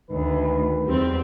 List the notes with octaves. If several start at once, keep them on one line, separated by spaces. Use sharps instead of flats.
D2 D#3 B4
E2 G3 C4